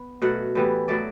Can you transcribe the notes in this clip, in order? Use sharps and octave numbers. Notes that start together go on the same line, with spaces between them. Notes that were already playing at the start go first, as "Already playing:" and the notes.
Already playing: B3
B2 F#3 A3 F#5
A2 E3 G3 B3
A2 F#3 A3 D5